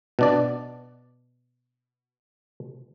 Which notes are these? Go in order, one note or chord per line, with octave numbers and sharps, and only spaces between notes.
B2 D4 D5